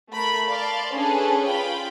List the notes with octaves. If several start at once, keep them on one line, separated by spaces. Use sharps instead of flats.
A3 A#4 B5
D5 F5 A5 C6
C#4 D4 G#4 A4 B4
F4 G5 B5